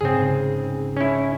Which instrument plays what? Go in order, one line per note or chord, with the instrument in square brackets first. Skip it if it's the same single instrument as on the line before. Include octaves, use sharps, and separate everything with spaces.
[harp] G#2 C#3 [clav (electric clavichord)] C4 G#4
[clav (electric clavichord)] C#4 E4